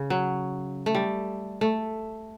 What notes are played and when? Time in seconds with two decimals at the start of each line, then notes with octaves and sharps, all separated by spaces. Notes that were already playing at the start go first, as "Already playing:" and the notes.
Already playing: C#3
0.10 F#3
0.86 A3
0.95 G3
1.61 A3